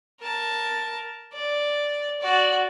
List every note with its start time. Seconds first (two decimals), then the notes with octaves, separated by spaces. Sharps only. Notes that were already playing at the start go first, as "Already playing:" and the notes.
0.21 A#4 A5
1.33 D5
2.21 F#4 D5